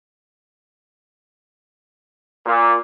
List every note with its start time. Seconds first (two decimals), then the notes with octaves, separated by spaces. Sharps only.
2.45 A#2